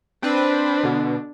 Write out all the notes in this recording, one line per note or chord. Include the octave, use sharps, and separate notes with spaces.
C4 D4 B4
B2 D3